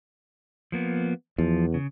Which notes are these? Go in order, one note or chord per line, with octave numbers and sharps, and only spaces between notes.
F3 A#3 B3
E2 F3
C#3